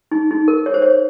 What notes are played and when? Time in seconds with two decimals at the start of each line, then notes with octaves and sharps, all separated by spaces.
0.11 D#4
0.31 D#4
0.48 A#4
0.66 C#5
0.74 C5
0.82 C#5